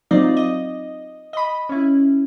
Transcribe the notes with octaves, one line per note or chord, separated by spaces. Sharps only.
F#3 C4 D#4 F4 D5 D#5
D#5
D#5 B5
C#4 E4